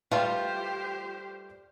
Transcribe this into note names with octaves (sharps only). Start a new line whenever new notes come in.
G3 A3 F4 G4 B4 C5 G5 F6